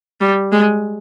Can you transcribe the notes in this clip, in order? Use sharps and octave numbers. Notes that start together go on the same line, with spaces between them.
G3
G#3